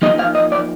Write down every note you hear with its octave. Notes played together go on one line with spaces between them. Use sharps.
F3 A#3 D#4 D#5
F5
D#5
D5